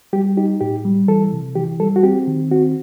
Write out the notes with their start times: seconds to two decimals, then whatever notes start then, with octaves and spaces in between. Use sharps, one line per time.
0.13 G3 G4
0.37 D#4 G4
0.61 A2 G4
0.85 G3
1.08 E3 A4
1.32 C3
1.56 E3 G4
1.79 G3 A4
1.96 F#4
2.03 C4 G4
2.27 D#3
2.51 C4 F#4